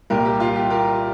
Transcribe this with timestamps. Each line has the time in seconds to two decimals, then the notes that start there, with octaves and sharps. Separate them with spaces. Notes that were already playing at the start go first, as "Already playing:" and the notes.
0.10 C2 A#2 G4 A#4
0.25 G4
0.40 F4
0.56 G4
0.70 G4 A#4